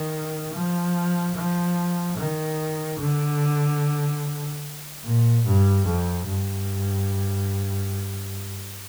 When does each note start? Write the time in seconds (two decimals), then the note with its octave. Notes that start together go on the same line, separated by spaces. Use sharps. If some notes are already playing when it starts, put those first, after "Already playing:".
Already playing: D#3
0.54 F3
1.35 F3
2.17 D#3
3.00 D3
5.04 A#2
5.45 G2
5.86 F2
6.27 G2